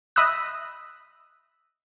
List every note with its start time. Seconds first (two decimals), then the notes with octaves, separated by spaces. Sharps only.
0.16 D#5 E5 B5 D#6 E6 F#6